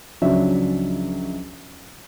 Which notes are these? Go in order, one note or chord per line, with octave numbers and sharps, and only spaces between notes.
C#2 F3 F#3 C#4 D4 E5